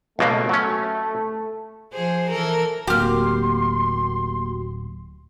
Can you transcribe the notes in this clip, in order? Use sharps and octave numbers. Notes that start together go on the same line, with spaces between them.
C#2 B2 A3 A#3
F#3 C#4
F3 G#4 C5
E3 A4 A#4
D1 A#3 F#4 G4 C6 F6